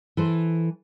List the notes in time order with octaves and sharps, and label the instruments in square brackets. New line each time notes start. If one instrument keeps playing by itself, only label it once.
[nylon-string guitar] E3 A4 C5